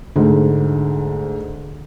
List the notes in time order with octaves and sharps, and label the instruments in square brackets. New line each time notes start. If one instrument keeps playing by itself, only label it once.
[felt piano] D2 G#2 [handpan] D3